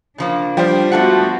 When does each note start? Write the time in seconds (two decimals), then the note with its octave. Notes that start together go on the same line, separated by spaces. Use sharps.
0.18 C#3 F3 A#3 D4
0.57 F3 G3 C5 G5
0.92 A3 B3 D4 F4 F#4 F#5